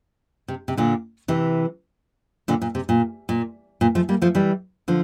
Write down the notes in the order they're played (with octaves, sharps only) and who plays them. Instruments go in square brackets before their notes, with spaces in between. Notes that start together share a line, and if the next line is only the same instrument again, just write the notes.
[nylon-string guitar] C3
C3
A#2 D3
C3 E3
A#2 D3
A#2
C3
A#2
A#2
A#2
F3 A3
G3 A#3
F3 A3
E3 G3
D3 F3